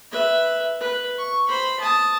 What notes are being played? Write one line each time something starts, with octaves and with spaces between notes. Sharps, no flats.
B4 E5
B4
C#6
C5 B5
A5 D#6